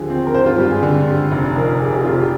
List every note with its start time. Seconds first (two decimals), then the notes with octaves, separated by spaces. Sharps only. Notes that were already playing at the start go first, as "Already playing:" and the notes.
Already playing: D#2 D3 F3 G4 G#4
0.10 C4
0.27 A#4
0.34 G#1 C5
0.46 F4
0.58 G2 G4
0.71 G#4
0.83 D3
1.07 G3
1.32 F1
1.56 F2 A#4
1.80 C3 G#4
1.93 G4
2.04 F1 F4
2.17 G4